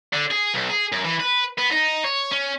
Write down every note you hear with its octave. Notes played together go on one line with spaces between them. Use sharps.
D3
G#4
B1
G#4
F#2
E3
B4
B3
D#4
C#5
C#4